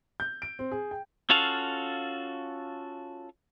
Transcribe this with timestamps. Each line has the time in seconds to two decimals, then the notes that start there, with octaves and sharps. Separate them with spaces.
0.20 G6
0.42 D7
0.59 C4
0.72 G#4
0.91 G5
1.30 C#4 F4 F#4 A4 F5